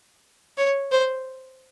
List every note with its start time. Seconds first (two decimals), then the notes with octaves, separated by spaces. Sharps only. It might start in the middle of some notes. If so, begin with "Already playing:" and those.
0.58 C#5
0.92 C5